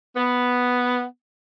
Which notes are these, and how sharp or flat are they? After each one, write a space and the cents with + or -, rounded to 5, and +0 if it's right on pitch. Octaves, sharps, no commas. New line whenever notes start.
B3 +0